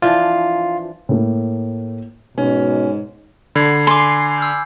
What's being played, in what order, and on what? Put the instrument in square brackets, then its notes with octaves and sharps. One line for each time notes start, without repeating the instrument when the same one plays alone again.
[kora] E3 F3 D4 [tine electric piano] F4
[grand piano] A2 A#3
[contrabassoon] G#2 [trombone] B2 [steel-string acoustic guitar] C#4
[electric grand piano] D3 [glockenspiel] B5 G#6 C7
[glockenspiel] G#5 D6 [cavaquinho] C6
[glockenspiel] E6 F6 G6